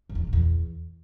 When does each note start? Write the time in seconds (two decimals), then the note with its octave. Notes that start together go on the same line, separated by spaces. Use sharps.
0.09 F#2
0.15 E2
0.21 D#3
0.27 A#2
0.33 E2